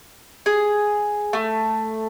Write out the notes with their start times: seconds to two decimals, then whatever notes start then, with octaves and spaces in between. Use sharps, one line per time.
0.46 G#4
1.33 A3